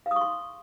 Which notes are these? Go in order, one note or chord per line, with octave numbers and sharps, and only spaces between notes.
F5
D#6
C#6
C6